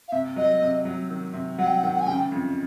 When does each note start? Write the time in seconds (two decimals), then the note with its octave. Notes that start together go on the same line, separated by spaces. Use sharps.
0.08 F5
0.12 C3 E5
0.36 F#3 D#5
0.62 C3
0.85 F#3
1.10 D#3
1.34 C3
1.58 F#3 F#5
1.67 G5
1.76 F#5
1.83 D#3 G5
1.94 F#5
2.01 G#5
2.07 C#3 G5
2.32 F2